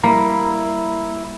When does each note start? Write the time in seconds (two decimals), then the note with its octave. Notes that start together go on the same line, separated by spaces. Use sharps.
0.04 G3 A#3 E4 A#5